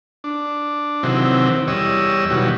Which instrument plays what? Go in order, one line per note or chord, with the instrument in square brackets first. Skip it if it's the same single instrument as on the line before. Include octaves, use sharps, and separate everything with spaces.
[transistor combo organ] D4
C3 D#3 E3 F#3 C4
E2 G3 C#5 D#5 E6
B2 D#3 E3 F#3 G3